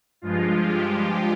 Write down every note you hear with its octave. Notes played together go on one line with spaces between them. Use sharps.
G2 F3 G#3 F4
G4